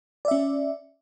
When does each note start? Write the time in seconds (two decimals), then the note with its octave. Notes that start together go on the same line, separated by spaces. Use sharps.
0.25 D5
0.28 E5
0.31 C#4